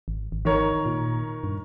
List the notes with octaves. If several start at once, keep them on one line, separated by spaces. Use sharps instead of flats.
G#1
G#1
D#3 A#4 C#5
A#2
G2